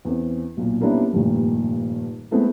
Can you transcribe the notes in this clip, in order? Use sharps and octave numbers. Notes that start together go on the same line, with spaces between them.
E2 C4
B1 A#2
G3 A#3 B3 C#4 D4 E4
F1 G2 A#2 D#3
G#3 A3 B3 C4 E4 A4